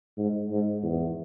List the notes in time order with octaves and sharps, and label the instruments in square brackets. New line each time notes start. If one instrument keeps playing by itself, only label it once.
[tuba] G#2
G#2
E2